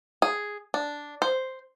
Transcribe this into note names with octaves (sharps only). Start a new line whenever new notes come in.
G#4
D4
C5